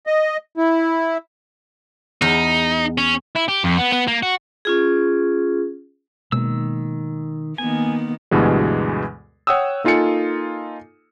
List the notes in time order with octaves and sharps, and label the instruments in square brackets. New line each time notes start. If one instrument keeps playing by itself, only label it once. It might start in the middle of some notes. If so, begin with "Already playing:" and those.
[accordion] D#5
E4
[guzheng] E2 [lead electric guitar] D#4
[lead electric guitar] C#4
[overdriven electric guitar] E4
G4
F2
B3
B3
A#3
F#4
[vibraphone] C#4 F4 G#4
[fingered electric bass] B2 G#3 A#3 [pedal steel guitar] D#3 E6
[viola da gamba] D#3 A#3 B3 [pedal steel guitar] G#5
[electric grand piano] D2 G2 B2 E3 G#3
C#5 F#5 G5 D#6 E6
A#3 D#4 F4 A4 G#5 C#7